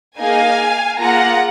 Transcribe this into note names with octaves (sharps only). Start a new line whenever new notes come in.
A#3 D#4 G#4 F5 G#5
A#3 F4 G#4 F#5 A#5